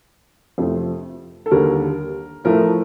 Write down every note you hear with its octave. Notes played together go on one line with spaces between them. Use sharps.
F2 C3 F3 A3
A4
D#2 D3 G3 A#4
A2 F3 A3 A#4